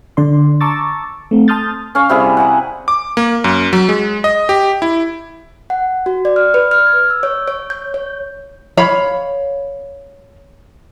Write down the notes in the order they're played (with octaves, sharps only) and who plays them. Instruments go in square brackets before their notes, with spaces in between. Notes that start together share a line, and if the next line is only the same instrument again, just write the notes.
[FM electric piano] D3 D5 C6
A5 A#5 C#6 D6 E6 A6
A3 C4
A5 C6 D#6 F6 G6 A6
[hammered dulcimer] C#4 C#5 F5
C3 G3 E4 G#4
F#5 G#5 A#5
[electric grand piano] D6
A#3
F#2
F#3
G#3
D#5
G4
E4
[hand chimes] F#5
F#4
D5
F6
B4
F6
G#6
E6
C#5
C#5
G6
C#5
[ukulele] C#5 F5 B5